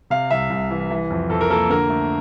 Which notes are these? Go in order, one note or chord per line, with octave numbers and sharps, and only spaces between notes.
C3 F5
C2 E5
C2
E3
E3
F2
F2 A4
A#4
A#3 A4
D3 A#4
A3